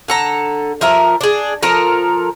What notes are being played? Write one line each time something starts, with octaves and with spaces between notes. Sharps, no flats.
D3 A4 A#5
F3 A#4 E5 A#5
D4 G#4
F3 A4 A#4 A#5